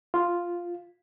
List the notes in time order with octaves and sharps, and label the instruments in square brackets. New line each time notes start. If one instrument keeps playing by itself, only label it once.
[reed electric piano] F4